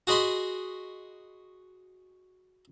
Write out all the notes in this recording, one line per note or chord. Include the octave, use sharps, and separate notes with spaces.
F#4 G#4 D#5 B5 C6